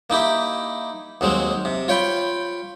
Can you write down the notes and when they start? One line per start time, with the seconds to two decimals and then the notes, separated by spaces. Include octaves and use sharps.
0.10 A#3 D#4 E4 G4
1.21 D#2 F#3 G#3 C4
1.65 C3
1.88 F4 C#5 G5 B5